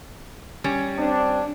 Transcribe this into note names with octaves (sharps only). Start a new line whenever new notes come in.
G3 C#4
C4 D4